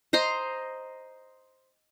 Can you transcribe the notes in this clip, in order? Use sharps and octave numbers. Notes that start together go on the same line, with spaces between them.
C5 D#5 A#5 C6